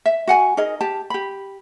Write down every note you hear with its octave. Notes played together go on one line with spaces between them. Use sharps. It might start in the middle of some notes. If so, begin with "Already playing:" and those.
E5
F#4 F#5 G#5
D#4 G#4 A#4 D#5
G4 A5
G4 B5